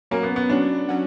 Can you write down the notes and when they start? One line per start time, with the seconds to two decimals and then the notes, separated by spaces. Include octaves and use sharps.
0.11 F#3 A#3 C#4 F#4
0.23 B3
0.36 B3
0.49 F#3 C#4 D4 F#4
0.89 F#3 C#4 F#4